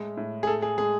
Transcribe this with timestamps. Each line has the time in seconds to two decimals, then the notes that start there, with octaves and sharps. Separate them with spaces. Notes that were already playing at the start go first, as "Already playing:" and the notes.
Already playing: A2 G#3
0.17 A2
0.43 G#4
0.47 A2 A4
0.62 G#4
0.78 G#3 G#4